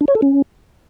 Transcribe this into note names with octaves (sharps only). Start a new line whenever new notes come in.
D4
C#5
A4
C#4